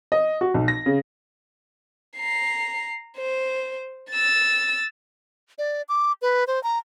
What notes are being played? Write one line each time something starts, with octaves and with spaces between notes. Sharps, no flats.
D#5
F#4
B1
A#6
C#3
A#5 C7
C5
E6 A6
D5
D6
B4
C5
A#5